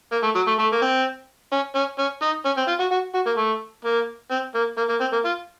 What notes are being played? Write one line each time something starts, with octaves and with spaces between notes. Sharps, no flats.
A#3
A3
F#3
A3
A3
A#3
C4
C#4
C#4
C#4
D#4
C#4
C4
F4
F#4
F#4
F#4
A#3
A3
A#3
C4
A#3
A#3
A#3
C4
A#3
F4